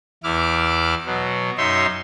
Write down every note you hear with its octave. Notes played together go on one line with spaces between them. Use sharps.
E2 E4 D6 F6
B2 F#3
F#2 D#4 C#5 E5 C6